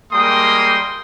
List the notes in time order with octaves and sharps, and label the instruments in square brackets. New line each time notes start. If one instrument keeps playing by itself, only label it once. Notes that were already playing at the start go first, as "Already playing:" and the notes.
[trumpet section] G3 G#3 A#3 G5 C6 D#6